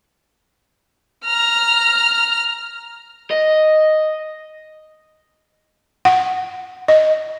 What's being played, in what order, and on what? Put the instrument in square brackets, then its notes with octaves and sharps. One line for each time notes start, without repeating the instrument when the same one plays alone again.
[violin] A#5 F6
[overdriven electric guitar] D#5
[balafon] F#5
D#5